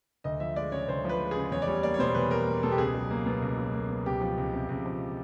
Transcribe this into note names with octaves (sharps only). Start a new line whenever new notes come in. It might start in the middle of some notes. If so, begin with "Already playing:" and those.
D2 D#5
F3 E5
G#3 D5
C#3 C#5
D2 C5
F3 B4
G#3
G#4
C#3
E2 C#5
D5
G3 C#5
A#3 D5
C#5
B2 C5
E2 B4
G3 A#4
A#3
B2 A4
G4
C#2 G#4
F#3
A#3
B2
C#2
F#3
A#3
B2
C#2 G4
F3
C#2
C3
C#2
F3